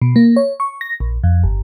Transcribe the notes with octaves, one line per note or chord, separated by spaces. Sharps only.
B2
A#3
C#5
C#6
A#6
A#1
F2
G1